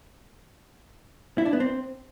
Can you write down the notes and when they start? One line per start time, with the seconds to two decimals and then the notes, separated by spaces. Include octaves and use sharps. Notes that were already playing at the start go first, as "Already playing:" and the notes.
1.38 E4
1.45 D4
1.53 B3
1.60 C4